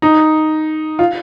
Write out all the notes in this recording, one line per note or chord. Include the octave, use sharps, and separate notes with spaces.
D#4
F4